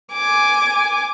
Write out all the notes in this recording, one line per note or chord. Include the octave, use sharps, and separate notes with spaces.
G#5 D6